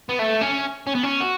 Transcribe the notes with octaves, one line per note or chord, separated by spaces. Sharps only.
B3
A3
C#4
C#4
B3
C#4
F#4